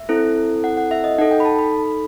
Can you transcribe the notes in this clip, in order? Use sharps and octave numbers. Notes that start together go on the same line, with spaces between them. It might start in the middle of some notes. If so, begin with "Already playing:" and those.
Already playing: E5
C4 E4 A4
F#5
F#5
E5
D#5
D#4 A4 F#5
G5
B5
A5
B5